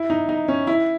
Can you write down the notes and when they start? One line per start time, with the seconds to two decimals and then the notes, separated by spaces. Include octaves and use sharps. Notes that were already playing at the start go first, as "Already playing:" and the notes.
Already playing: E4
0.10 D#4
0.29 D#4
0.48 C#4
0.67 E4